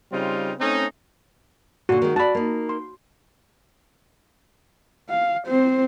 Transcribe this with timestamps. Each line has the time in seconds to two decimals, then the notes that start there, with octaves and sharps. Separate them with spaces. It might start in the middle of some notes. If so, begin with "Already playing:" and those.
0.12 C#3 G3 C4 D#4 F4
0.59 A3 C4 C#4 D#4
1.89 A#2 D3 F#4
2.02 D#3 G#3
2.16 F#4 D5 A5 B5
2.35 A#3 D#4
2.69 C6
5.10 F5
5.47 C4 C5